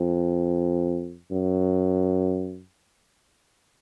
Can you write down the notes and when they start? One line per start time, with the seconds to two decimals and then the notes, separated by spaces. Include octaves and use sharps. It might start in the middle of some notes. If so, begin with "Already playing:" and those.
Already playing: F2
1.31 F#2